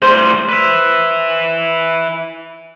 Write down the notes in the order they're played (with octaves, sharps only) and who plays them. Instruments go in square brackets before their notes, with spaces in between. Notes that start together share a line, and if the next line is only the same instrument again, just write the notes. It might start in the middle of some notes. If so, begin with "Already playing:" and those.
[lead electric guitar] A2 G3 [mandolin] C5
[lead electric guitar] B4 E5